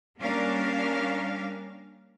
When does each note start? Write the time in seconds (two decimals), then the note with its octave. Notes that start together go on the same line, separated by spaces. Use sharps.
0.20 G3 A#3 C#4 D4 A#4 F5